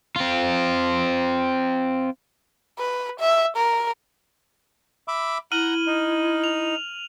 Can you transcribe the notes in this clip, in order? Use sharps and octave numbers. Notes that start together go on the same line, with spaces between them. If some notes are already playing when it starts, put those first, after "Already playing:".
C4 F4
B4
E5
A#4
E5 B5 D6
E4 F#5 A#5 F6 D#7 F#7
D#4
F7